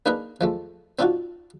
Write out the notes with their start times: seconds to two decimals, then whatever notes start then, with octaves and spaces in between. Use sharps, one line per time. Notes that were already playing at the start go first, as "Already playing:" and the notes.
0.06 A#3 D4 D#4 G#4 A#4 B4
0.41 F3 G#3 A3
0.99 C4 D4 D#4 F4 F#4